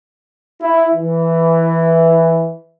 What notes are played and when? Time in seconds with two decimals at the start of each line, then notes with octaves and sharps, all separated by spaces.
0.61 E4
0.95 E3